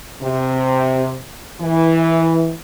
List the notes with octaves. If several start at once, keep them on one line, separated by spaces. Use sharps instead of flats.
C3
E3